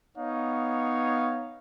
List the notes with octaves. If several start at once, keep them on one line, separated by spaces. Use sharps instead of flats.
B3 D#4 C#5 F5